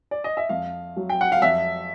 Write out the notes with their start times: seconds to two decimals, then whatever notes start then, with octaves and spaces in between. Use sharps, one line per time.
0.11 D5
0.24 D#5
0.37 E5
0.49 F2 F5
0.97 F#3
1.09 G5
1.21 F#5
1.32 F5
1.42 F2 E5